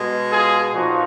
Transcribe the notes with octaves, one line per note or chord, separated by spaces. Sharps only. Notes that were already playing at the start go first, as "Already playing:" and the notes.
Already playing: B2 G#3
F4 G#4
A#2 F3 D#4 F#4